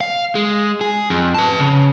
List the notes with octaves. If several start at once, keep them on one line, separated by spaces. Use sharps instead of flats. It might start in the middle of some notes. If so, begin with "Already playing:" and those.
F5
G#3
G#4
F2
B4 A5
C#3